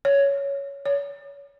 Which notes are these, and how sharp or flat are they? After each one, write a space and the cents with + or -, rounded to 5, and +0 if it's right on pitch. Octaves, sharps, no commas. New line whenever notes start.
C#5 +10
C#5 +30